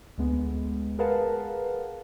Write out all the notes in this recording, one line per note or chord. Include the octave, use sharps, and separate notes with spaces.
D2 G#3 B3
G#4 A#4 B4 F5 F#5 A5